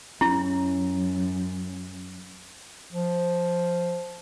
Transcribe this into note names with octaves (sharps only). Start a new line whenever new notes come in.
F#2 C#4 E4
F3